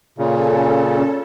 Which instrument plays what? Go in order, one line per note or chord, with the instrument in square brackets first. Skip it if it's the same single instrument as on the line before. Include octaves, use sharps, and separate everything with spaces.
[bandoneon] A#2 C#3 [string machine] C#4 A4